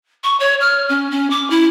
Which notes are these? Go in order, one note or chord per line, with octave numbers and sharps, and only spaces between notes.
C#6
C#5
F6
C#4
C#4
D6
E4